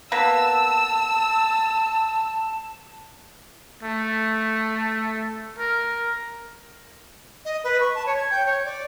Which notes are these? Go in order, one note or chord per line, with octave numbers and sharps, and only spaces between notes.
A#3 B3 B4 A5 E6
A3
A#4
D#5
B4
C#6
A5
C#5
G#6
G5
C#5
D5